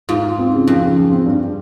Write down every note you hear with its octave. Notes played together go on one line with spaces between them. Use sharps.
G#2 F4
F4
C4
C#3
F2 F3
C#3
F3
C4
G2